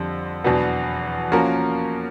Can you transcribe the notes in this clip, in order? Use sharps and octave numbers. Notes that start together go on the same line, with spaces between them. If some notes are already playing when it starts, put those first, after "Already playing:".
Already playing: F2 D3 G3
E2 B2 F#3 B3 D4
F3 A#3 C#4 F#4 A#4